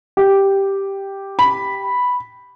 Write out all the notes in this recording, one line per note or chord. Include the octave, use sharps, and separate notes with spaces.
G4
B5